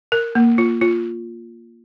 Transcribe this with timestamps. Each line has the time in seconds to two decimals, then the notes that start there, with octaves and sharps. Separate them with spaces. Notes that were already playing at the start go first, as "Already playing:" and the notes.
0.12 A#4
0.35 A#3
0.58 F4
0.81 F4